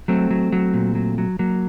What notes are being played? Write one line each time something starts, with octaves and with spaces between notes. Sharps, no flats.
F#3 A3 C4
F#3
F#3
A#2
F#3
F#3
F#3 A#3